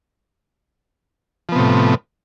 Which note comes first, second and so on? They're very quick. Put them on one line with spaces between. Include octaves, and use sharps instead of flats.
F3 B3 C3 A2